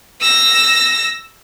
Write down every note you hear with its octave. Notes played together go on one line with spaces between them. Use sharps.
E6 A#6